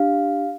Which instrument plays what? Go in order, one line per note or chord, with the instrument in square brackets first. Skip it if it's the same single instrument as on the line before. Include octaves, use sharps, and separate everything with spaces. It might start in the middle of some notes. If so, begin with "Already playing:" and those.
Already playing: [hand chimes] D4 G4 F5